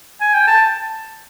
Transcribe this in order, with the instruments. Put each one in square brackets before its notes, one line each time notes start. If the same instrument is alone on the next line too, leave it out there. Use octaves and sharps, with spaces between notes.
[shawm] G#5
G5
A5